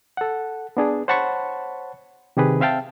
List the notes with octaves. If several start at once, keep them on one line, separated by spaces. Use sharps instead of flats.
A4 F#5
B3 D4 G#4
C5 C#5 F#5 A5 B5 C#6
C3 D#3 G4 G#4 B4
C4 E5 F5 G5 A5